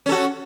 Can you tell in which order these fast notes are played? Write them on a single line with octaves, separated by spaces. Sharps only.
C#4 A4 F#4